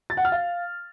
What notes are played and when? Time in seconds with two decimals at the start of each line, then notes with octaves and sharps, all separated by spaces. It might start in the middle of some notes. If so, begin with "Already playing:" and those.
0.10 A6
0.17 F#5
0.25 F6
0.32 F5